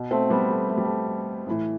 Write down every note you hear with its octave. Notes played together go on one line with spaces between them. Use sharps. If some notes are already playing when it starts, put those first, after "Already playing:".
Already playing: B2
A3 C4
G3 B3
A3
A3
G3
A3
A2 E3